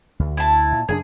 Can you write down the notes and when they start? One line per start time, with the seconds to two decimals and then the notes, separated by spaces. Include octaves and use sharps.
0.19 D2
0.37 E4 A5
0.72 A#2
0.88 F#2 C#3 D4 G#4